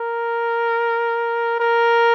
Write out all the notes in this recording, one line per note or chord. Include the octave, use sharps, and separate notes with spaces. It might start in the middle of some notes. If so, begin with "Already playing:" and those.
Already playing: A#4
A#4